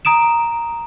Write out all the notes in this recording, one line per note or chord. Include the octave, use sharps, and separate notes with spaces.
A#5 D#6 D7 E7